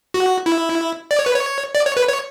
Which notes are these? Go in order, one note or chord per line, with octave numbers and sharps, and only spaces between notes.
F#4
E4
D5
C#5
B4
C#5
D5
C#5
B4
C#5